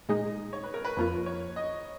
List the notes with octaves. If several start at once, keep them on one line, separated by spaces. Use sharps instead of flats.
A#2 G#3 D#4 D#5
C#5
B4
A#4
B4
F2 F3 A#3 F4 B4
C#5
D#5